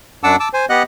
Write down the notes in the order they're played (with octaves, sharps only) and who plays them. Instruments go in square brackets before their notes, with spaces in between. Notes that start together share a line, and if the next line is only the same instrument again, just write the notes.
[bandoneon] F#2 D4 F#5 A5 D6 E6
A5 D6 E6
C5 G#5
B3 G4 D#5 F#5 F#6